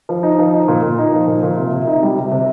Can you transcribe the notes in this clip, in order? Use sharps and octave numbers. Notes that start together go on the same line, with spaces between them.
F3
D#4
F3
D#4
A#2
A#2
D#4
F3
A#2
A#2
C3
C3
D#4
G3
C3
C3